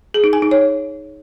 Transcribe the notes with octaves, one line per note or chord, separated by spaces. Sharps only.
G#4
D#4
G#5
D#4
C#5